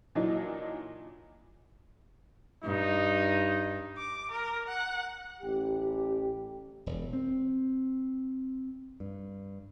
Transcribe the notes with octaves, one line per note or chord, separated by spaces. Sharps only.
A#2 E3 F#3 D4 D#4
G2 D#4
D6
A#4
F#5
A1 G4
E1
C4
G2